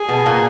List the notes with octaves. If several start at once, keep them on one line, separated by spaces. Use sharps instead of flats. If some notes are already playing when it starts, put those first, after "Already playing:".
Already playing: G#4
B2 B3
A#2 A#3